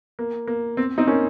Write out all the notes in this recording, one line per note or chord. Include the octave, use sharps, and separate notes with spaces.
A#3
A#3
C4
C4 D#4
A#3 C#4